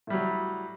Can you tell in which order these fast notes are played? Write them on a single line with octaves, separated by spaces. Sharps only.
A2 G3 F#3